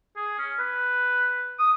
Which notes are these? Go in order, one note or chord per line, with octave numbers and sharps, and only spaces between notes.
G#4
C#4
B4
D#6